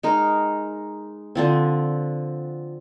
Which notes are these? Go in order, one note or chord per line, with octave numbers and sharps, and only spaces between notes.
G#3 D#4 A#4
D3 F3 C4